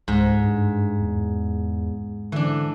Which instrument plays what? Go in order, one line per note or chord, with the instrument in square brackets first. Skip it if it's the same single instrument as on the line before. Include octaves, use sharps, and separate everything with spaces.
[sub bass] C#2 [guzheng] G#2
[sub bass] G2
E2
[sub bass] D3 [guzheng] E3 D4